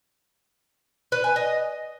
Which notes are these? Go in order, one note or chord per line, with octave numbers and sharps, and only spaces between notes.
B4
G#5
D#5